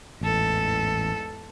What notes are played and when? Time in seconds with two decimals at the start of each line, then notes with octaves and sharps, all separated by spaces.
0.21 A1 E2 G#2 A4